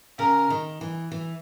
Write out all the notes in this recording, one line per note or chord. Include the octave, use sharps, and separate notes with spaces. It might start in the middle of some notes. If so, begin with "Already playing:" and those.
C#3 A#4
D#3
E3
E3